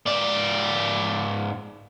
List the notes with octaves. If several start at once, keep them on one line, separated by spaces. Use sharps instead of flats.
G#2 D5